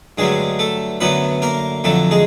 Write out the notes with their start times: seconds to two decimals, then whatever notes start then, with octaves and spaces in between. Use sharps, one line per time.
0.18 G2 D3 F#3 G#3 A3 G#4
0.59 A3 A4
1.00 F#2 D3 F#3 A3 B3 B4
1.42 A#3 A#4
1.84 F2 D3 F#3 A3 A4
2.11 G#3 G#4